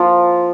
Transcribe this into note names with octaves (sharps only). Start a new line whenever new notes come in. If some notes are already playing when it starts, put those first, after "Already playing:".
Already playing: F3 A#3 F4